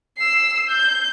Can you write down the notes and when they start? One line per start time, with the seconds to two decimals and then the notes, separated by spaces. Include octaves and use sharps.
0.17 E6 C7
0.70 G6